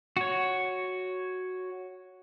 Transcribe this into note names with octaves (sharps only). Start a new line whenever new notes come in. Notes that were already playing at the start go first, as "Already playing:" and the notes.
F#4 C#5